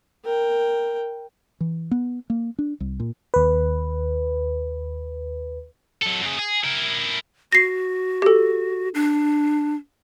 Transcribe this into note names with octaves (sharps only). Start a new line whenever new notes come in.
A#4 G5
E3
B3
A#3
D4
C2
A#2
D#2 B4
F#3 A4
F#2 G#4
G#4
E4 A#4
F#4 A#6 C7
G4 A4
D4